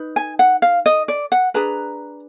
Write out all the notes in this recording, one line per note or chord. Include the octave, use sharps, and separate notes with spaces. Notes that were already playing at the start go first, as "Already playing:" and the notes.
Already playing: D#4 B4
G#5
F#5
F5
D#5
D5
F#5
D4 G#4 B4 A#5